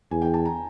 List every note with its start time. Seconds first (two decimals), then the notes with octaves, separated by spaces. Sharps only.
0.11 E2 G#5
0.22 G5
0.34 A5
0.45 A#5